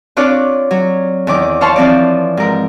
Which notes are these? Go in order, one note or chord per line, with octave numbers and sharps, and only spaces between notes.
C4 D4 F4 C#5 D6 F#6
F#3
E2 D#3 D6
C5 C#5 F5 A5 C6 C#6
E3 F3 C4 F4 D5
G#2 A#4